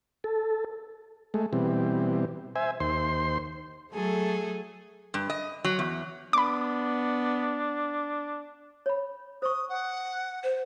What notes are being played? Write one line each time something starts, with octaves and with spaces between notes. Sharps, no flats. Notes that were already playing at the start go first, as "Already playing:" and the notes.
A4
G#3 A3
B2 E3 G3 C4
C5 E5 G#5
D#2 C5 C6
F#3 A3 G#4 A4
G2
D#5
F#3
E2
B3 D4 B5 D6
C#5 B5
C5 C#6 D#6
F#5
C5